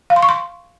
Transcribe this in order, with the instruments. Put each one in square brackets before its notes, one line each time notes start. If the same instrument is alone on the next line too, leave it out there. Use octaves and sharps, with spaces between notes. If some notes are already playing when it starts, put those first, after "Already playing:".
[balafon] F5
C6
C#6
C6